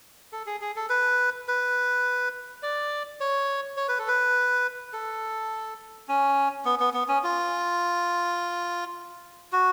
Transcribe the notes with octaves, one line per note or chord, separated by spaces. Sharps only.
A4
G#4
G#4
A4
B4
B4
D5
C#5
C#5
B4
A4
B4
A4
C#4
B3
B3
B3
C#4
F4
F#4